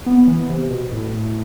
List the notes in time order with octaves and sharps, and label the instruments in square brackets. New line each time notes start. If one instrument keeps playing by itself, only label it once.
[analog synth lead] B3
E3
C3
B2
A2